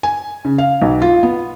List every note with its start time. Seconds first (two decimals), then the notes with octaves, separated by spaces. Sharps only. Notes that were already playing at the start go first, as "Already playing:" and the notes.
0.03 G#5
0.45 C#3
0.58 F5
0.82 B1
1.02 F4
1.23 B3